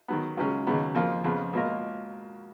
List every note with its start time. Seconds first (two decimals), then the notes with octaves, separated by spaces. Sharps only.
0.08 D#3 F#3 B3
0.37 C#2 C#3 F#3 C#4
0.67 D#2 C#3 F#3 B3
0.95 F2 F3 A#3 F4
1.24 F2 C#3 F3 B3
1.53 C#2 B2 A#3 F4 A#4